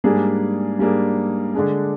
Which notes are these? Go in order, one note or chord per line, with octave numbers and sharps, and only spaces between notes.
G#2 G3 A#3 D4 G#4
G#2 G3 A#3 D4 G#4
D3 G#3 D4 G#4